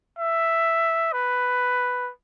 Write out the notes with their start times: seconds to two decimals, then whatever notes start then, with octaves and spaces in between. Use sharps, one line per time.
0.19 E5
1.13 B4